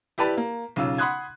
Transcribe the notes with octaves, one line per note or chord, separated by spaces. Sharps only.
E4 G4 B4 D5 A5 B5
A#3
B1 C#3 F4 E6
F#5 B5 C6 D#6 F#6 G#6